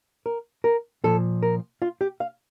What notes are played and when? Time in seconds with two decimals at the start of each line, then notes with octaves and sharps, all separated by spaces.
0.26 A#4
0.64 A#4
1.04 A#2 F3 A4
1.43 A#4
1.82 F4
2.01 G4
2.20 F5